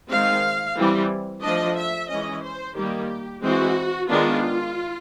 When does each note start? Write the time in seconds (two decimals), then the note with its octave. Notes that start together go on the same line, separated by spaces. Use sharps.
0.10 D#3 G#3 C4 F5
0.77 E3 G3 C4
1.43 F3 A3 D4 D#5
1.77 E5
2.09 E3 G#3 C#4 D#5
2.43 C5
2.76 D#3 G3 A#3 G4
3.42 E3 G#3 C4 F#4
4.09 D#3 G#3 B3 D4 F4